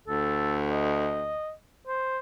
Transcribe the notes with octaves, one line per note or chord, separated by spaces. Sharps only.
D2 A4
D#5
C5